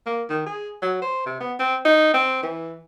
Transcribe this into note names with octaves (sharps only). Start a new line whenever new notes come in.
A#3
D#3
G#4
F#3
C5
C3
B3
C4
D#4
C4
E3